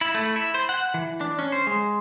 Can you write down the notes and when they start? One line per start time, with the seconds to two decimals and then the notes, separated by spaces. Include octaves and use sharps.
0.01 E4
0.15 A3
0.36 E4
0.54 C5
0.69 F#5
0.94 E3
1.21 D4
1.39 C#4
1.52 C5
1.67 G#3